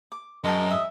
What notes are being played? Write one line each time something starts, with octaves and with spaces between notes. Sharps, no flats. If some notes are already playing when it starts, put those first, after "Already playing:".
D6
F#2 G#3 A#4 G5 A5 C#6
E5 D#6